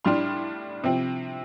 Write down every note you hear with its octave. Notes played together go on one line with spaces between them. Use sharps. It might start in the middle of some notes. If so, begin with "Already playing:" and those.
A2 G3 D4 C6 F6
C3 F3 C4